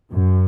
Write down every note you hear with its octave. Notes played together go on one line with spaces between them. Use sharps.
F#2